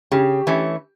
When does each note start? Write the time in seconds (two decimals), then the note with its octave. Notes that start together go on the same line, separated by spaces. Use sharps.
0.12 C#3 G4
0.47 E3 A3 C#4